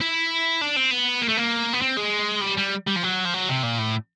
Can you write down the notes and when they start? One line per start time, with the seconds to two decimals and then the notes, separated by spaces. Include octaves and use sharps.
0.01 E4
0.61 D4
0.76 C4
0.91 B3
1.22 A#3
1.29 A3
1.37 A#3
1.73 B3
1.82 C4
1.97 G#3
2.42 G3
2.58 G3
2.88 G3
2.97 F3
3.04 F#3
3.25 F3
3.34 F#3
3.49 C3
3.63 A#2
3.78 A2